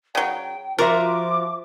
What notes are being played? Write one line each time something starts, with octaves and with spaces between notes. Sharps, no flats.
C#3 F#3 G5
F3 F4 F#4 A#4 E5 D6